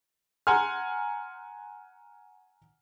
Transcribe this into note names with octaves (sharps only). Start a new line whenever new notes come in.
F#5 G#5 A#5 C6 F6